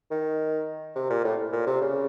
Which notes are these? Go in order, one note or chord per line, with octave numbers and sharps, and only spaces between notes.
D#3
C3
A#2
A2
A#2
C3
C#3